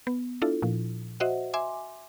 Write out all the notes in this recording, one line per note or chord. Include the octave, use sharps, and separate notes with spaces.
B3
D4 E4 F4 A4
A#2 F3
F#4 C5 D#5 E5 F#5
E5 G#5 C6 D6